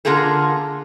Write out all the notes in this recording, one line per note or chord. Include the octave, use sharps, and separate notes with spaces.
D3 A#3 F4 G#4 A4